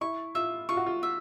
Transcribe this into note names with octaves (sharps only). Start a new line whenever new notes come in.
E4 C#6
F4 E5
F4 C#6
F#4
F4
E5